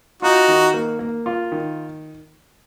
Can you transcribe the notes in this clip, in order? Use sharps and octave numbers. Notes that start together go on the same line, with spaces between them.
D#4 F4 F#4
D#3
A#3
A#3
F4
D#3